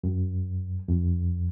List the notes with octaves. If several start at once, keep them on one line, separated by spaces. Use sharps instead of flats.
F#2
F2